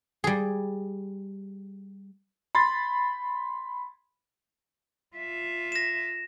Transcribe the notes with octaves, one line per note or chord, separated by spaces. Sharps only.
G3 G#4
B5 C6 A6
F4 E5
A#6 E7